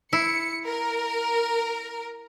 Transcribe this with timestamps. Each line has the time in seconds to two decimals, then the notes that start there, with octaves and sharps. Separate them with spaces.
0.13 E4 C#7
0.64 A#4